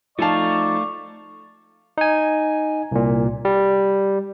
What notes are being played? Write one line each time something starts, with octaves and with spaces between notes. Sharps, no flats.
F3 A3 D#4 A4 D5 F5 A5 C#6
D#4 G#5
C2 A#2
G3